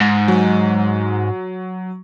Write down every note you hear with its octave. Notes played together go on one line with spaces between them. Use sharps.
G#2
F#3